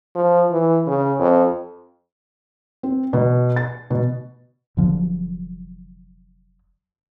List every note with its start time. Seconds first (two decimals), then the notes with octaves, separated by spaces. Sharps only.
0.15 F3
0.51 E3
0.87 C#3
1.19 F2
2.83 C4
3.13 B2
3.56 A6
3.90 B2
4.77 F1 D3 F3 F#3